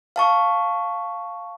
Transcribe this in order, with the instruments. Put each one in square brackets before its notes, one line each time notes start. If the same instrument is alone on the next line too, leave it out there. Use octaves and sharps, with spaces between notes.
[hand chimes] F5 A5 C#6